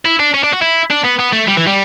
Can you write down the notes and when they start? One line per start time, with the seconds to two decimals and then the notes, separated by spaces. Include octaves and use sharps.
0.05 E4
0.20 D4
0.34 C#4
0.44 D4
0.53 F#4
0.62 E4
0.91 D4
1.05 B3
1.19 B3
1.33 A3
1.48 G3
1.57 E3
1.67 G3